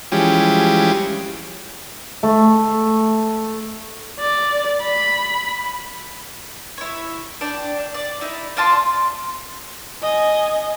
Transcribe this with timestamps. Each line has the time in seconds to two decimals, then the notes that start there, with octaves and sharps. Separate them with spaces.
0.12 E3 F3 G3 G#3 C#4 G4
2.23 A3
4.20 D5
4.82 B5
6.78 E4 C#5
7.41 D4 D5 G5
7.94 D5
8.21 D#4 E4
8.57 D4 F4 A5 C6
10.02 D#5 G#5